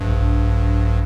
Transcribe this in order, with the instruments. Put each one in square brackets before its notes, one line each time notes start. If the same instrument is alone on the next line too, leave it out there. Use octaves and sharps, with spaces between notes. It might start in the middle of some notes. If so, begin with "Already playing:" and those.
[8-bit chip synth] A#1 G2